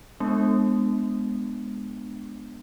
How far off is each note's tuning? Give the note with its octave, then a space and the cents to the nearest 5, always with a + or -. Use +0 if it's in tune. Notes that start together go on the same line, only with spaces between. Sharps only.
G#3 +0 B3 +0 D4 +20